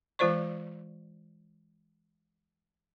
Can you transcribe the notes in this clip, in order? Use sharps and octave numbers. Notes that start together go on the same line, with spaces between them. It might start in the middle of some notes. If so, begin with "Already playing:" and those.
E3 G#3 F4 C5 D5 C#6